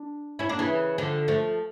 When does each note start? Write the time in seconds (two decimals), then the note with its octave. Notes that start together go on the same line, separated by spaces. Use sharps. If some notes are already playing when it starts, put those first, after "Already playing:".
Already playing: D4
0.39 C#4 E4
0.49 A#3 D4
0.59 C#3 E3
0.98 D3 F3
1.28 F3 A3